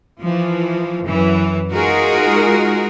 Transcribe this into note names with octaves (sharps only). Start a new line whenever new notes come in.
E3 F3
F#2 E3
G#3 D#4 F4 F#4 G#4 A#4